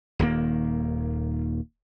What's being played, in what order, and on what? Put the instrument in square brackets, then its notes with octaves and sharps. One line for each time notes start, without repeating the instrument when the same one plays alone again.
[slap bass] D#1 D#2 D#3 A#3